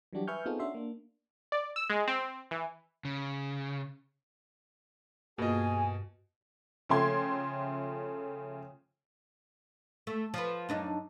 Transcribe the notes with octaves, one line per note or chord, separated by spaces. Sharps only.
E3 F#3 G3 D4 F#4 G4
B4 E5 G#5 C#6 F6 G6
B3 C4 D#4 F4 G#4 A4
C#4 D4 F#4 E5 C6
A#3 D4
D5
E6
G#3
C4
E3
C#3
G2 B2 A#3 F4 F#4 G#4 D#5 G#5
C#3 F3 A3 G5 C6 G#6
A3
F3 B4
F#2 D4 D#4